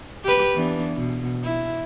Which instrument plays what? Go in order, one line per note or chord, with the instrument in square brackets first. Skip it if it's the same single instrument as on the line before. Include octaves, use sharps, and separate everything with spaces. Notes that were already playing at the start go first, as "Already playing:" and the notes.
[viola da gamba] G4 B4
E3 B3 D4
B2
E4